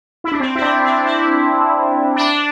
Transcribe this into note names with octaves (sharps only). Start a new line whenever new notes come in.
E4
D4
C4
E4
D4
C4
E4
D4